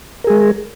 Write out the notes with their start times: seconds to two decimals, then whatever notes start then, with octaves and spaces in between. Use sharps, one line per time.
0.24 A#4
0.27 G#4
0.30 G#3